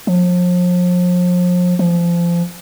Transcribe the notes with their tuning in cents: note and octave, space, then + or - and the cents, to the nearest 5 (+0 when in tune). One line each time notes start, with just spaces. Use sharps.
F3 +35
F3 -25